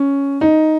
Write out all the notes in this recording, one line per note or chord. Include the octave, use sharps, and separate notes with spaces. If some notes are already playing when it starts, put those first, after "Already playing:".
Already playing: C#4
D#4